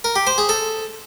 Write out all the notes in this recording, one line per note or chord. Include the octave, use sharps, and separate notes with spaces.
A#4
G4
C5
G#4
A4